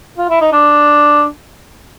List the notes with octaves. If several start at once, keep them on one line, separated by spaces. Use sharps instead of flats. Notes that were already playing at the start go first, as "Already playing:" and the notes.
F4
E4
D#4
D4